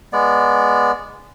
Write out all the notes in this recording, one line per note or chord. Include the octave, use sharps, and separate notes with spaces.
G#3 B3 D5